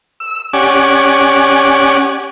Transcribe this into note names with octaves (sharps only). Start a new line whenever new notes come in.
E6
C#4 G4 D5 F#5 G#5